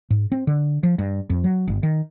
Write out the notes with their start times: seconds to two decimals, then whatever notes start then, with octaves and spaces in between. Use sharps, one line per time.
0.10 G#2
0.32 C4
0.47 D3
0.83 F3
0.99 G2
1.30 F2
1.44 F#3
1.68 G1
1.83 D#3